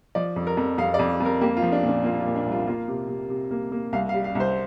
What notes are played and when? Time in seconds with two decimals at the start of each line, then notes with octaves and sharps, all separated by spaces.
0.15 F3 D5
0.36 F2
0.47 A#4
0.57 F2
0.78 F2 F5
0.94 D5
0.99 F2
1.20 F2
1.25 A#4
1.41 A#3 G4
1.57 F4
1.62 F3
1.72 D4
1.83 A#2
1.89 D4
2.04 A#3 F4
2.20 F4
2.25 A#2
2.36 D4
2.46 C2
2.52 F4
2.67 A#3 F4
2.88 C3
3.09 C3
3.30 C3
3.51 A#3
3.72 A#3
3.93 C2 F5
4.09 F5
4.14 G3
4.24 F5
4.35 C2
4.40 C5